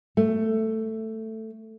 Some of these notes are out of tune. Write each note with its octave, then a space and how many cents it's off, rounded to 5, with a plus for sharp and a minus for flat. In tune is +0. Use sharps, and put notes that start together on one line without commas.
A3 +10